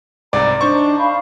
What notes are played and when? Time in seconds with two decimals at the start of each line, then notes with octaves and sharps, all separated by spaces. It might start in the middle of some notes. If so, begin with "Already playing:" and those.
0.33 C2 G#2 D5 A#5
0.61 D4 D#4 C5 C#6
0.98 F5 B5